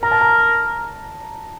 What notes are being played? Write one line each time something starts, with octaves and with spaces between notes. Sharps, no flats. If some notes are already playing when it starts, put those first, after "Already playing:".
A#4 A#5
A5
A#5